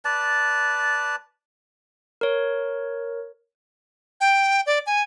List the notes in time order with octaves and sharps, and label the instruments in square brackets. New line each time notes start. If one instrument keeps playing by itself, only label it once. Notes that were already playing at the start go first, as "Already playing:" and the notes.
[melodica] B4 D5 A5
[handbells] A#4 C#5
[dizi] G5
D5
G#5